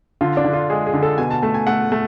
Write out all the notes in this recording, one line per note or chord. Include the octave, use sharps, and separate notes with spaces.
D3 F4
D4
D3
F4
G#3 G#4
G#4
D3
A4
B2 G#5
A5
A3 A5
G#5
A3 F#5
A3